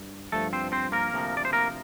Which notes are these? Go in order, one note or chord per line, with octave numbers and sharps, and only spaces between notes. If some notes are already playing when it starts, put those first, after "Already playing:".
Already playing: G2
G2 F3 A3 A4
C4 C5
C4 C5
A#3 A#4
D2 C3 F3
D5
C5
A#3 A#4